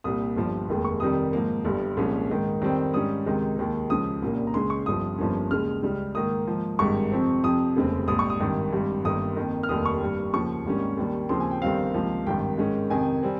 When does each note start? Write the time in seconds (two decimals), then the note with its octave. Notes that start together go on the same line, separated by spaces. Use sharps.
0.04 C2 A#2 G3 D#6
0.36 G1 G2 F3
0.69 F1 D#2 D#3 G#3
0.85 C#6
1.00 F2 C3 D#3 G3 D#6
1.33 G#2 F3 A#3
1.65 G1 G2 G3
1.97 C2 A#2 F3 G#3 C#4
2.30 G#2 D#3 G#3
2.62 F2 D#3 G3 C4
2.94 G#2 G3 C#4 D#6
3.26 C#2 C3 D#3 G#3
3.58 D#2 D#3 G#3
3.90 C#2 C#3 F3 D#6
4.22 C2 A#2 G3 A#3 C#4
4.47 A#5
4.54 C#2 C#3 G#3 C#4 C6
4.70 C#6
4.86 G1 G2 F3 D#6
5.18 G1 G2 F3 A#3 C#4
5.51 D#2 C#3 G#3 F6
5.82 C#2 C#3 G3
6.15 G#2 D#3 A#3 D#6
6.48 G#2 F3 A#3
6.79 G#1 G2 D#3 G#3 C#6
7.12 F2 C3 F3 C4
7.43 F2 C3 F3 D#6
7.76 F1 D#2 C#3 G#3 C4
8.08 A#1 G#2 G3 D#6
8.19 C#6
8.30 D#6
8.40 G#1 G2 D#3
8.73 G#1 G2 G3
9.05 G1 G2 D#3 A#3 D#6
9.37 F2 D#3 A#3
9.63 F6
9.69 F1 D#2 D#3 G3 D#6
9.86 C#6
10.01 G2 G3 A#3
10.34 D#2 C#3 F3 C#6
10.65 G#1 G#2 G3 A#3 C#4
10.97 D#2 D#3 G3
11.29 D#2 C#3 F3 C4 C6
11.40 G#5
11.51 G5
11.61 G1 G2 D#3 G3 C4 F5
11.94 C#2 C3 F3 A#3
12.26 G#1 G2 D#3 G5
12.58 G#2 D#3 G#3 C#4
12.90 F2 C3 D#3 G#5
13.23 G3 C4